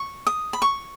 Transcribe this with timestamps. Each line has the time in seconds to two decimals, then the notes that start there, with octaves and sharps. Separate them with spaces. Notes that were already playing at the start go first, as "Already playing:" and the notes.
Already playing: C#6
0.27 D#6
0.53 B5
0.62 C#6